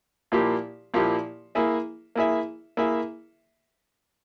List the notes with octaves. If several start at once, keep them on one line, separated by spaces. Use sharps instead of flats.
A#2 F3 A#3 E4 G4
A#2 F3 A#3 E4 G4
A#3 E4 G#4 E5
A#3 E4 G#4 E5
A#3 E4 G#4 E5